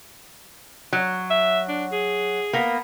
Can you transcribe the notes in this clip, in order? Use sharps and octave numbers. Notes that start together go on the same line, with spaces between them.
F#3
E5
D4
G#4
A#3 B3